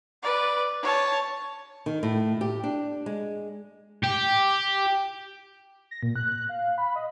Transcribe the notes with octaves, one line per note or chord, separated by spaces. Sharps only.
B4 D5
C#5 A5
D#3
A2
G4
D4
G#3
G4
A#6
A#2
F#6
F5
B5
D#5